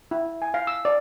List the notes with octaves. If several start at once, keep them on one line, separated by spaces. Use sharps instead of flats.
E4
G#5
F5
E6
D5